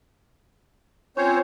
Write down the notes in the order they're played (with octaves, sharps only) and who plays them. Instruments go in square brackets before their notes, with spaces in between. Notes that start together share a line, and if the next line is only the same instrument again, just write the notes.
[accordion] C4 C5 C#5 [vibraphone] C#4 F4 G#5